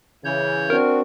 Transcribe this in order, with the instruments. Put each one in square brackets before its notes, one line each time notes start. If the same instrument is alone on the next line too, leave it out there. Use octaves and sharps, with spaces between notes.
[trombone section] C#3 E3 [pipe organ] C#5 G6
[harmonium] C4 D4 F#4 [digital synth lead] A#4